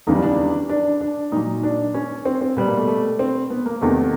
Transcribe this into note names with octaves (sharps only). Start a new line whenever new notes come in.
E2 C#3 E3 G3 D#4
D4
D4
D4
A#2 F#3 D#4
D4
C#4
C4
C4
B2 G3 B3
A#3
A3
A3
C4
B3
A#3
E2 C3 D#3 A3